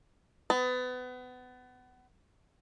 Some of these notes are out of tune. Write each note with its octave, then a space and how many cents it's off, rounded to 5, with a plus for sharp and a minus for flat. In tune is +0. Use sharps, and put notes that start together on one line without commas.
B3 +30